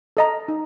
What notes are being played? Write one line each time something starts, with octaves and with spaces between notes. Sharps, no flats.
A4 D#5 A#5
D#4